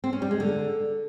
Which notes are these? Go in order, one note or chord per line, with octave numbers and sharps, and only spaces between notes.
C4
C#4
G3
G#3
D3